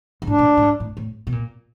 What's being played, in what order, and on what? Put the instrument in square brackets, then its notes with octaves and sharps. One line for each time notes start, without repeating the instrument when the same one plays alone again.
[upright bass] G#2
[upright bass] A2 [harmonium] D4
[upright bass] A#2
A2
A2
G#2
A2
A2
B2
A#2